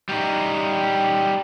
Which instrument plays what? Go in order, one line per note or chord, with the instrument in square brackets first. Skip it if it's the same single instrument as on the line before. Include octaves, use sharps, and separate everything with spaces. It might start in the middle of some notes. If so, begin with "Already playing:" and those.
[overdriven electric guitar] G3 D#4